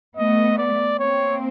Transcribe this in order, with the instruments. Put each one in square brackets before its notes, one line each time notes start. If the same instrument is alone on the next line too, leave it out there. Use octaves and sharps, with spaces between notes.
[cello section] A3 B3 [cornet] D#5
[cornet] D5
[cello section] A#3 C4 [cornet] C#5